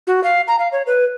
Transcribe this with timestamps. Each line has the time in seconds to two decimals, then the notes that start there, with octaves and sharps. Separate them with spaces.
0.07 F#4
0.24 F5
0.48 A#5
0.59 F5
0.72 C#5
0.87 B4